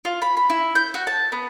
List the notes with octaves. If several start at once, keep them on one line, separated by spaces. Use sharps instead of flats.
F4
B5
B5
E4
G6
F#4
A5
B3